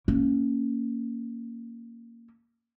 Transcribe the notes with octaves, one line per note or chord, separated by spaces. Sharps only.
A#3 C#4